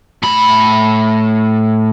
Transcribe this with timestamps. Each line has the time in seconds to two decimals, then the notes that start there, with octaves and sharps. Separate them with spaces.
0.23 A2 B5